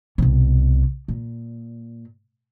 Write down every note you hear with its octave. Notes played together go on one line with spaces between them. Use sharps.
C2 B2
A#2